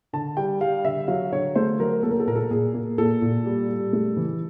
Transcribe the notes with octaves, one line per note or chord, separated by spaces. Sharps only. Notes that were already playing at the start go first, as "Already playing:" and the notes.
D3 A5
G3 G5
G3 F5
D3 E5
F#3 F5
D3 C#5
A3 C5
F#3 A#4
A#3 A4
A#4
A4
A#2 A#4
A4
A#2 G#4
A#3
A#2 A4
A#2
G3
G3
A3
E3